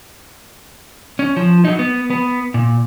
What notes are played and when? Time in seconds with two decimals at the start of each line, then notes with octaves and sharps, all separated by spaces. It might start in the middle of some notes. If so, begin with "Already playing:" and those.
1.19 C#4
1.36 F3
1.65 F#3 D#4
1.79 B3
2.10 B3
2.54 A#2